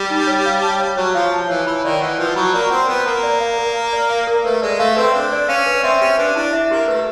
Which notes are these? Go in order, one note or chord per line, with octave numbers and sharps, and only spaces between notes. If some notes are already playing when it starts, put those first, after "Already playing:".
Already playing: G3
D#4
C#5
F5
A5
C#5
F#3 C#5
F3 F5
A5
E3 C#5
E3 B5
D#3 D5
E3 F#5
F3 B4
F#3 B5
A#3 D5
C4 F#5
B3 B4
A#3 A#5
D5
F5
A#4
A#5
D5
F5
A#4
A3 B4
G#3 D5
A3 F5
C4 B4
D4 B4
D5
C#4 F5
B4
C4 E5
C#4 G4
D4 B4
D4 E4
E5
A#3 G4
A3 B4